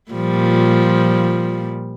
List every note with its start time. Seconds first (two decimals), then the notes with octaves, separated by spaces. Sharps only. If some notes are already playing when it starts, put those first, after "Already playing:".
0.11 A#2 F3 G3